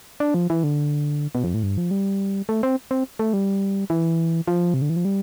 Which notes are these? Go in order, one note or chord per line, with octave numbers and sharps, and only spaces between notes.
D4
F3
E3
D3
B2
F2
A2
G2
F3
G3
A3
C4
C4
A3
G3
E3
F3
C3
D3
E3
F3
G3